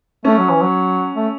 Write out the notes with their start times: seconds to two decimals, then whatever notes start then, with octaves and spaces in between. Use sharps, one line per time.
0.25 A3 C#4
0.38 F#3
0.50 E3
0.62 F#3
1.16 A3